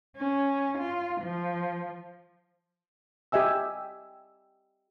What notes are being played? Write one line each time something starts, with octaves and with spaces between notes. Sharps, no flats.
C#4
F4
F3
G4 D#5 E5 G#5 E6